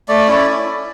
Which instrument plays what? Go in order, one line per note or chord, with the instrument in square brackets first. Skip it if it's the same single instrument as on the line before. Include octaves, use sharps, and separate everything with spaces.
[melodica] A3 D5
C#4 E4